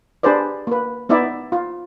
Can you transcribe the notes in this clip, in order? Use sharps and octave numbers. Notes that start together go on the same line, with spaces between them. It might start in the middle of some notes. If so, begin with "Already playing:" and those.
D4 G4 G#4 B4 C5 D5
A#3 B4
B3 D#4 E4 D5 E5
F4